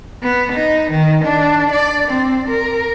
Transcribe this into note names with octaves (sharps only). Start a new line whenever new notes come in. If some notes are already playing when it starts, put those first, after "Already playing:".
B3
D#4
D#3
D4
D5
C4
A#4